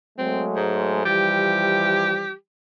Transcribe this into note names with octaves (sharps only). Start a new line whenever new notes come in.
F#3 G#3 A3 C4
G#2
E3 F3 G3 G4